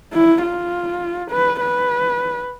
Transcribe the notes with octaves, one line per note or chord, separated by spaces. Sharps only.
E4
F4
B4
B4